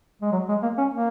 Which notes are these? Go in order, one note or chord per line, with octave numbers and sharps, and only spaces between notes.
G#3
F#3
G#3
A#3
C#4
A#3